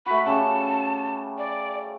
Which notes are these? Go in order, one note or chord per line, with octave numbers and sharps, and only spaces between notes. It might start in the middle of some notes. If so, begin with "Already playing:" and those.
A3 F#4 B5
C#3 G3 A5
D5